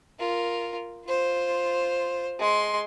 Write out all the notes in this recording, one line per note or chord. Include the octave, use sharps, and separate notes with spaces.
F4 A#4
F4 C5
G#3 C6